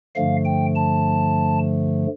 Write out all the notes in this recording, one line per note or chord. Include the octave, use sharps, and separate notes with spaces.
G2 D3 F3 A3 F5
G5
A5